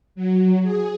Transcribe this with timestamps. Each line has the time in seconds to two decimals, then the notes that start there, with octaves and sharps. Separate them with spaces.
0.15 F#3
0.63 G#4